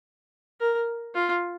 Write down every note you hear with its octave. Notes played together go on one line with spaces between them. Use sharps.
A#4
F4